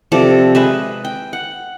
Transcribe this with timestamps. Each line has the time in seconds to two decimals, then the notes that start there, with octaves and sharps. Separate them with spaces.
0.12 C3 F3 A4 D5
0.55 G#3 B4 E5
1.05 G5
1.33 F#5